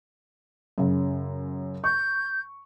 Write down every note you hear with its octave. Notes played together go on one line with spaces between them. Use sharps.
F#2 C#3
C#6 G6